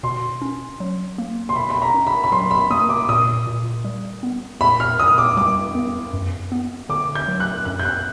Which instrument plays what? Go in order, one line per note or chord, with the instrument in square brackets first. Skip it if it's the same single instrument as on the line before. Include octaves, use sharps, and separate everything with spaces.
[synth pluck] B2 [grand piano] C6
[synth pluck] C#4
F#3
A#3
[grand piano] C6
[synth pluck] B2 [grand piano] B5
[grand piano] B5
A#5
[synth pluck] C#4
[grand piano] B5
B5
[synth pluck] F#3 [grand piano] C6
[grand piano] B5
[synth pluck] A#3 [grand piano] D#6
[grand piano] D6
[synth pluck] A#2 [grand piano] D#6
[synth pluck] A#2
G3
B3
[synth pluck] A#2 [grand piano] B5
[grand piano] F6
[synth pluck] A#2 [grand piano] D#6
[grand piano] D6
[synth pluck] G3 [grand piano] D6
[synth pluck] B3
F#2
B3
[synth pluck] D3 [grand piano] D6
[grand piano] G6
[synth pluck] F#3
[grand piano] F#6
[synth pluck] F#2 [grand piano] F#6
[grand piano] G6
F#6